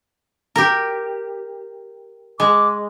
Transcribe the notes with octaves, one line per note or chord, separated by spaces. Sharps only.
G4 A#4
G#3 D6